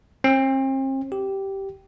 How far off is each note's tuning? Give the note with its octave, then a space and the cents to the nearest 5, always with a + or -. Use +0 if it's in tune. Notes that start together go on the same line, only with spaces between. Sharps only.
C4 +40
G4 -10